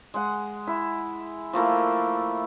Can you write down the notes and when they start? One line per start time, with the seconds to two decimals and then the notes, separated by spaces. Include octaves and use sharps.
0.14 G#3 F#5
0.67 E4
1.53 F3 A3 A#3 E4